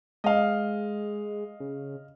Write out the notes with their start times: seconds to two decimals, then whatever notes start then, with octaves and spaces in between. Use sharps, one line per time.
0.24 G#3 D#5 F5
1.60 C#3